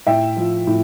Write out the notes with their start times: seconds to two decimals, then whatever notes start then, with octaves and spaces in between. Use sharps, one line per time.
0.07 A2 E5 G5
0.37 F3
0.67 A2